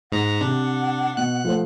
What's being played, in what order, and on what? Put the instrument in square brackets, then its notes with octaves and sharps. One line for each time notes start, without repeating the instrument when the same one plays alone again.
[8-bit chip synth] G#2 A#5 [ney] F#5
[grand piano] C3 [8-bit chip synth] D4
[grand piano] B2 [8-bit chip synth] F#6
[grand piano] F3 A3 C5